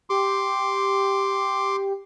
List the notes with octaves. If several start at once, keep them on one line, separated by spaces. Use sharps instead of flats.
G4 C6 D6